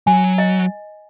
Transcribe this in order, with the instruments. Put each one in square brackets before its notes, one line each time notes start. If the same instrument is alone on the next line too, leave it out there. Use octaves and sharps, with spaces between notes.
[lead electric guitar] F#3 [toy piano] G#5
[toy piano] D#5